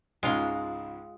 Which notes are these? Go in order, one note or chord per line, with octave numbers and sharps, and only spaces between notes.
C#2 G#2 C#3 G#3 F4